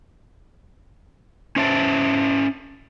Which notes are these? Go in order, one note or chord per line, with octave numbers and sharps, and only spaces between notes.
C#4 C5 E5 A5